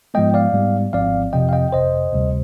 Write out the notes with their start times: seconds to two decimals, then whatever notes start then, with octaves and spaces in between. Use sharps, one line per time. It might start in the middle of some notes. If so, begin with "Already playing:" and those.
0.14 G#2 F3 G#3 B3 D#5 G5
0.34 D5 F5
0.53 G#2 G3 B3
0.93 G#1 G#2 F3 C4 D5 F5
1.33 F2 C3 F3 D#5 G5
1.49 F5
1.53 D#5 G5
1.72 G1 F2 C3 C5 D#5
2.13 D2 C3 G3